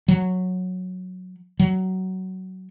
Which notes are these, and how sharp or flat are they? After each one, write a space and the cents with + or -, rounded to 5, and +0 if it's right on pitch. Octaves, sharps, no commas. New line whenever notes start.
F#3 -10
F#3 +15